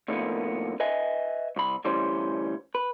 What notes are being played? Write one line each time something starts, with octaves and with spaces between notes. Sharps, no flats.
A2 D3 D#3 F3 A#3 B3
B4 D#5 E5 G#5
C2 B5
D2 E3 G3 C#4 C5
B4